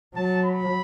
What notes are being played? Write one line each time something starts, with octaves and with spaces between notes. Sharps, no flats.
F#3 A5
B5